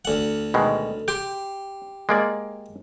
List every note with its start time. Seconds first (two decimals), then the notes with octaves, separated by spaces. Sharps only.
0.05 D2 F#5
0.54 B2 D#3 G#3
1.08 G4 G5 C6
2.09 G#3 A#3 D5